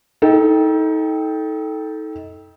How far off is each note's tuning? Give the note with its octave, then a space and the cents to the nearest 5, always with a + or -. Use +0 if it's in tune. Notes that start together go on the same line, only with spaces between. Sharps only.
D#4 +30 A4 -10 G5 +0